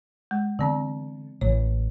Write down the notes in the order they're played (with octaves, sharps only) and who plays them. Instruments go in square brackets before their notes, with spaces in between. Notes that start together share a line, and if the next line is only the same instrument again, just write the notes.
[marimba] G#3
[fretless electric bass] D3 [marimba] E3 B3 C4
[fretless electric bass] A1 E3 [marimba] C#5